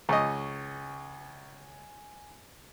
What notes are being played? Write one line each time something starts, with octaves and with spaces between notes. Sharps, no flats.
C#2 D#5 G#5 C#6